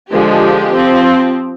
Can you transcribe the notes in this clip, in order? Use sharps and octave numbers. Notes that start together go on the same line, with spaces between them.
D3 F3 G#3 G4
F3 C4